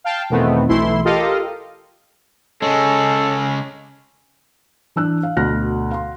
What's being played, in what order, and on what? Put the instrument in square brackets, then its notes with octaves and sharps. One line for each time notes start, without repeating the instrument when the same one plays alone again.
[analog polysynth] F5 G5 A5
E2 B2 D#3 A3 B3 C4
B1 E3 A3 E4 C6
F4 G4 A4 A#4 D#5 F5
[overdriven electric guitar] C#3 G#3 [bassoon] C#4 [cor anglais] A4
[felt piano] E3 D4 E6 F#6
F5
D2 B2 F6 F#6 A#6
F5 C6